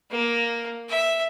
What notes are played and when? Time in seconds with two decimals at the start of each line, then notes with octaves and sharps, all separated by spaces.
0.11 A#3
0.89 E5